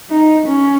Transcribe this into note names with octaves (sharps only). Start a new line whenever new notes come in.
D#4
C#4